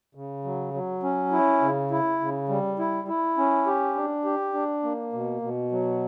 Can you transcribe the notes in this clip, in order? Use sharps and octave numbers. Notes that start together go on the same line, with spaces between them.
C#3
F#3
F#3
C#4
E4
C#3
E4
C#3
G3
E4
E4
C#4
G4
D4
G4
D4
A#3
B2
B2
F#3